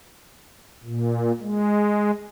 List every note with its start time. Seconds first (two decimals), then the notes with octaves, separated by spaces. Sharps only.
0.84 A#2
1.40 G#3